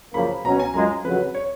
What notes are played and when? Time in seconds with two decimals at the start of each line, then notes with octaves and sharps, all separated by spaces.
0.14 F#2 C#3 F3 A#3 B5
0.44 B2 F#3 C#4 A#5
0.59 G#5
0.74 F#2 F3 G#3 A#5
1.04 F2 C#3 F#3 B4
1.35 C#5